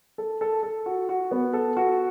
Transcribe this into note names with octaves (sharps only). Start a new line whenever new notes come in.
A4
A4
A4
F#4
F#4
B3
A4
F#4